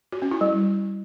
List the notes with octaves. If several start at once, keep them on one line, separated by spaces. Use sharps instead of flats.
F#4
C#4
E4
G3